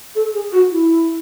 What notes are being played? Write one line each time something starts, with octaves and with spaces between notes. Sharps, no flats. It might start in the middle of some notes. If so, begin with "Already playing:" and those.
A4
G#4
F#4
E4